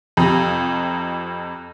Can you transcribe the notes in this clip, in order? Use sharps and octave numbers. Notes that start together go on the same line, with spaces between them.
F2 C3